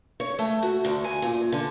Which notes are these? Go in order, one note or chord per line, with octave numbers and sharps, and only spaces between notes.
C#5
A3
F#4
D2
G#5
A#2
D3